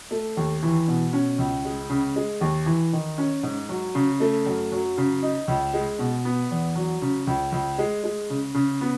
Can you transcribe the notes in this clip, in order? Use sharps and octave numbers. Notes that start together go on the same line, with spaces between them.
A3
D#2
E3
B2
C#4
C#2
G#3
C#3
G#3
D#2
E3
D#3
C#4
G#2
F#3
C#3
A3
F#2
F#3
C#3
D#4
C#2
G#3
B2
B3
E2
F#3
C#3
C#2
C#2
G#3
G#3
C#3
C#3
B3